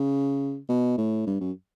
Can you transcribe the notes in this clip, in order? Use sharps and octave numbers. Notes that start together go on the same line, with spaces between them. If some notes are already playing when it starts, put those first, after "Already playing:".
Already playing: C#3
B2
A2
G2
F#2